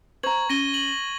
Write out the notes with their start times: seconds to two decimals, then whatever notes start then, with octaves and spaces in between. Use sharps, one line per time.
0.23 C5 A#5 C#6 G#6 F#7
0.49 C#4 A#6 D#7 G7
0.74 F#7